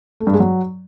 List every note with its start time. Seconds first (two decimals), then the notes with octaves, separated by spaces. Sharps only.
0.20 A3
0.27 G2
0.33 G#3
0.40 F#3